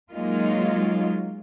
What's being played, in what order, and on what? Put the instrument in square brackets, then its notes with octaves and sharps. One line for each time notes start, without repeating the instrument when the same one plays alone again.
[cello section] F#3 G#3 A#3 D#4 F4